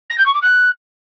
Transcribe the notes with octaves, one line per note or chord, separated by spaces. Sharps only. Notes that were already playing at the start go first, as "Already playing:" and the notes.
A#6
G6
C#6
D6
F#6